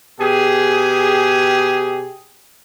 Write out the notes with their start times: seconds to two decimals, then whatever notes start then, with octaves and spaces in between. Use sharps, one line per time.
0.20 B2 G4 G#4